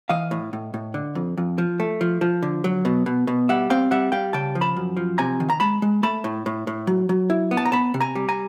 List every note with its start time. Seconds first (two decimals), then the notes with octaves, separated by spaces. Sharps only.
0.09 E3 D#5 F5
0.31 A2
0.53 A2
0.74 A2
0.94 D3
1.15 F2
1.37 F2
1.58 F3
1.80 A3
2.01 F3
2.21 F3
2.42 D3
2.64 F#3
2.85 B2
3.06 B2
3.27 B2
3.49 G3 E5 F#5
3.70 C4 F5 G5
3.91 G3 E5 F#5
4.12 G3 F5 G5
4.33 C#3 G5 A5
4.55 F3
4.61 A5 B5
4.76 F#2
4.97 F3
5.18 C3 G#5 A#5
5.40 D#3
5.50 A#5
5.60 G#3 A5 B5
5.82 G#3
6.03 A3 A5 B5
6.24 A2
6.46 A2
6.67 A2
6.87 F#3
7.09 F#3
7.30 E4
7.51 B3
7.57 A5
7.65 A#5
7.72 B3 A5 B5
7.94 C3
8.00 G#5 A#5
8.15 G3
8.29 G#5 A#5